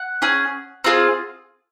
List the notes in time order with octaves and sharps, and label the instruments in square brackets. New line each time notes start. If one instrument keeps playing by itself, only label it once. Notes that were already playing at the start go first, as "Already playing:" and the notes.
Already playing: [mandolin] F#5
C#4 G#4
C4 F4 G#4